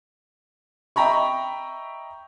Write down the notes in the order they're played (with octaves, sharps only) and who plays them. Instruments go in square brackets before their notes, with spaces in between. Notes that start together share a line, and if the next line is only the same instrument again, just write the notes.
[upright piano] D#5 E5 G5 A#5 B5 C#6